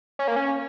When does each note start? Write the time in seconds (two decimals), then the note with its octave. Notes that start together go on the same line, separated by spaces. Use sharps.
0.19 C#4
0.28 A#3
0.36 C#4